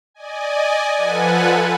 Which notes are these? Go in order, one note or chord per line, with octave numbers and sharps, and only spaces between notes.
D5 D#5 G#5
F3 F4 A4 B4 F#5 G#5